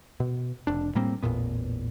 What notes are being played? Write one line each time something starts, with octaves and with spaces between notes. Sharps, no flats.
B2
F1 D4
A2 G3 A#3 C4
A1 E2 A#2 B3